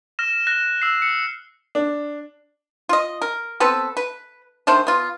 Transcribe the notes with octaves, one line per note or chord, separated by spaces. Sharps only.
F6 A#6 E7
F#6 A#6
E6 C7
C#7
D4
F4 D#5
A#4
B3 C4 A4 B4
B4
D#3 A3 D4 C5
B3 F4